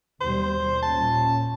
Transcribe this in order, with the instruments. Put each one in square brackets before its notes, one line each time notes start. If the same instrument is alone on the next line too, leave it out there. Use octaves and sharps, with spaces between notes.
[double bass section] D#2 B2 G3 [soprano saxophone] C5
[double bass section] A#2 C#4 [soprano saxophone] A5